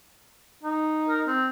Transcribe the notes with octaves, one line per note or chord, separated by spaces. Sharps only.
D#4
A#4
C4